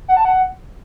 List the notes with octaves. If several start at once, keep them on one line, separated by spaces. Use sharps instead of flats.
F#5
A5
F#5